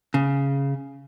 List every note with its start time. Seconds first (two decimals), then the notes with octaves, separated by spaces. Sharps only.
0.14 C#3